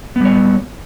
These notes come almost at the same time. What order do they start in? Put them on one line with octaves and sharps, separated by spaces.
B3 G3 C#5